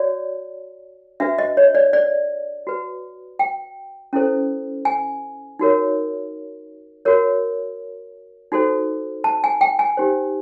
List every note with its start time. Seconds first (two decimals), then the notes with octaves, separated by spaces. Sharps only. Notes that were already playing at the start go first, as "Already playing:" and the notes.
Already playing: F#4 C#5 D5
1.20 D4 F#4 B4 E5
1.38 D#5
1.57 C#5
1.75 D5
1.93 D5
2.67 F#4 B4
3.39 G5
4.13 C#4 E4 A4 C5
4.85 G#5
5.59 D#4 F#4 A#4 C#5
7.05 F#4 A#4 C#5
8.52 D#4 F#4 A4 C5
9.24 A5
9.44 G#5
9.61 G5
9.79 G#5
9.97 D#4 G4 C5